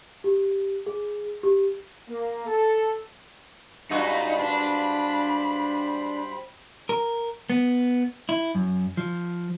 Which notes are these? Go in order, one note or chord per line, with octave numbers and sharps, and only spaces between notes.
G4
G#4
G4
A#3
A4
G2 G#3 C#4 D#4 F4 F#4 B5
D4 C5 G5
A#4
B3
E4
F#2
F3